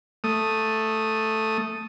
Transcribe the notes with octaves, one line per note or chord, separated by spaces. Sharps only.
A3 D#6